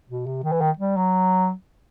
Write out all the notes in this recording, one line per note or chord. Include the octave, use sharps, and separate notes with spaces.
B2
C3
D#3
E3
D#3
G3
F#3